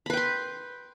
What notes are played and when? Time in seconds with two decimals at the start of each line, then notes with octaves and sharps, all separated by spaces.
0.06 B5
0.10 B4
0.13 G5
0.17 C6